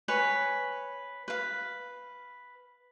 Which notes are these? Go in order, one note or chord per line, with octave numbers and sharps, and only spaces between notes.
B4 C#5 G#5
B4 F5